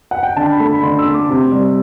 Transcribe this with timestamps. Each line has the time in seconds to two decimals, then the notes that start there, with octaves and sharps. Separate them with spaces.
0.11 F#5
0.23 G5
0.36 D3 A5
0.52 B5
0.60 A3
0.67 B5
0.83 D3 C6
0.99 E6
1.06 A3
1.14 D6
1.29 C3 C6
1.52 G3